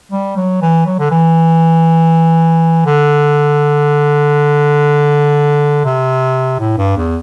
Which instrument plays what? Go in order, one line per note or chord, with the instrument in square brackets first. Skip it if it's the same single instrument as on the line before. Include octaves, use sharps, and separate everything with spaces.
[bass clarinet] G3
F#3
E3
F#3
D3
E3
D3
C3
A2
G2
E2